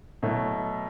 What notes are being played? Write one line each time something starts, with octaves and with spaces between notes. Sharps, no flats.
B2 F#3 A3 E4